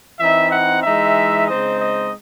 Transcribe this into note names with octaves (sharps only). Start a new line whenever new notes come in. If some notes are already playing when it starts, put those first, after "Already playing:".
E3 C4 D#4 E5
F#5
E3 G#3 D#4 E5
C#3 G#3 C4 D#4 D#5
D#5